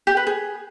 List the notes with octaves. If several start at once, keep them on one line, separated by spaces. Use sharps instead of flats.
G4
B4
G#4